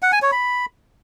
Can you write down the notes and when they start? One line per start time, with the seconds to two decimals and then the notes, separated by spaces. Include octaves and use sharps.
0.02 F#5
0.12 G#5
0.22 C#5
0.32 B5